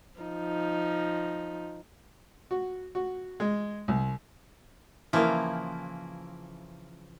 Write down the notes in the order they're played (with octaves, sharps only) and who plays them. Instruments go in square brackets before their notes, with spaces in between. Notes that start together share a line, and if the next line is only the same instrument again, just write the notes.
[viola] F3 D#4
[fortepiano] F#4
F#4
G#3
C2
[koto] C#3 E3 F3 [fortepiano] A#3 E4